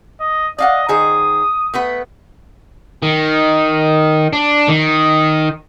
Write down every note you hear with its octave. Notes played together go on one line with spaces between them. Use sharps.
D#5
D5 D#5 F5 F#5
D#3 G#4 C5 D#6
A3 B3 B4
D#3
D4
D#3